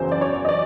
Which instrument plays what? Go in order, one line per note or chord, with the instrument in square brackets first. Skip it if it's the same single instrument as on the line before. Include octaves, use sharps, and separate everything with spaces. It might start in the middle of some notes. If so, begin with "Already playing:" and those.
Already playing: [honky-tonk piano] F#1 E2 C#3 F#3 C5
D5
C#5
D#5
D5